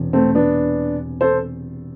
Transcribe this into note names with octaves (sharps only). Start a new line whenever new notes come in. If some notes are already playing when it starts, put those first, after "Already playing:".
Already playing: E1 E2 C3
A3 C4
B3 D4
A4 C5